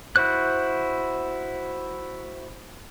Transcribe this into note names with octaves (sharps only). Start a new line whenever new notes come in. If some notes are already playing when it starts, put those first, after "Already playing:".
E4 F#4 C5 F#6